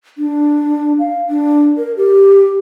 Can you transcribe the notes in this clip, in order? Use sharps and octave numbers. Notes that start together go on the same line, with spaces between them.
D4
F5
D4
A#4
G4